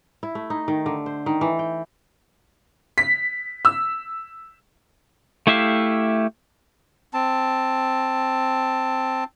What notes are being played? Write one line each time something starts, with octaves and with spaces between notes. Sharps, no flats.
E4
A3
D#4
D#3
D3
C5
D#3
E3
G5
B6
E6
A3 E4 G4 E5 F5
C4 A5